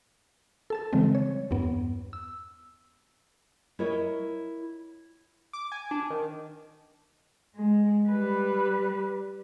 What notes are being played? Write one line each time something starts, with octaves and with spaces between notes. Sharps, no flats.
A4 A5 A6
C#3 E3 G3 G#3 C4
C#5
E2 G2 B3
E6
E4 A#4 C#5 D#5
D6
G#5
D4
D#3
G#3
G3 B4